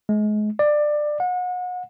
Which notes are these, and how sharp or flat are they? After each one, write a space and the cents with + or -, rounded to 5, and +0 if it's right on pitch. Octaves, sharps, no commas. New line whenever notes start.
G#3 +30
D5 +20
F#5 -35